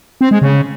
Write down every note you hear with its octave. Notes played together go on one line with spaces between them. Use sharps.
C4
G#3
C#3